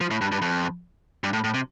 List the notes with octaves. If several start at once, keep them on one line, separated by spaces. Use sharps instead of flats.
F3
A2
G2
G2
F2
G2
A2
A2
C3